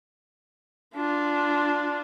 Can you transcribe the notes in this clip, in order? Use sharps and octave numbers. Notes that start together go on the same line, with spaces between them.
D4 F4